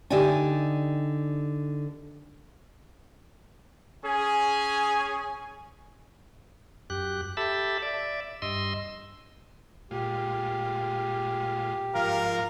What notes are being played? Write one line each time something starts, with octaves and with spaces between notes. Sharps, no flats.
D3 D#4 G4 D5 G5 G#5
C#4 G#4 G#5
F#2 G4 F#6
G4 A4 E5 A5 B5
D5 E5
G2 D#5 C6 E6
A#2 G#3 F4 G4
G#2 F3 F4 A#4 F5